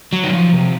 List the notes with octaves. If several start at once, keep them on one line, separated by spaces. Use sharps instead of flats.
F#3
D#3
F3
C3